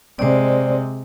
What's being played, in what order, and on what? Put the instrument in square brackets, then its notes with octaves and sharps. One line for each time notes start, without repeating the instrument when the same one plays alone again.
[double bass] C3 G#3 [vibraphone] C5 D5